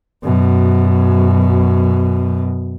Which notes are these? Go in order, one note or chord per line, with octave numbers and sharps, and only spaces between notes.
F#2 B2